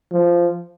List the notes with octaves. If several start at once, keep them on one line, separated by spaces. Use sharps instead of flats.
F3